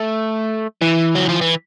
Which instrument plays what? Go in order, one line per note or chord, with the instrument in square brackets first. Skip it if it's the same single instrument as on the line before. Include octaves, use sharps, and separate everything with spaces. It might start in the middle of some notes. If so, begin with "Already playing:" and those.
Already playing: [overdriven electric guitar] A3
E3
F#3
F3
E3